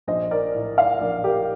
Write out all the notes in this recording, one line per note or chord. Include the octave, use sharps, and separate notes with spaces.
A#1 C5 D#5
A#4 D5
A2
D5 F5
A#1 A#4 D5
G4 A#4